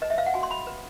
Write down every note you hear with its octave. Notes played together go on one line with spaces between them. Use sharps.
B4 D#5
E5
B4 F5
F#5
F#4 G#5
C6
F#4 B5
B4